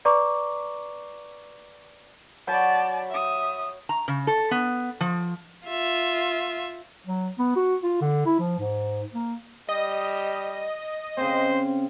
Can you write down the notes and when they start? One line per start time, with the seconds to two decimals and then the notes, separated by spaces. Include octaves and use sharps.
0.05 B4 D5 A#5 C#6 D6
2.47 F#3 D5 G5 A5 B5
3.10 E5 D#6
3.89 A#5
4.08 C#3
4.27 A4
4.51 B3
5.01 F3
5.67 F4 E5
7.07 F#3
7.38 B3
7.56 F#4
7.83 F4
8.01 D3
8.26 E4
8.39 F3
8.59 G#2
9.14 A#3
9.69 G3 D#5
11.17 C#3 C4 C5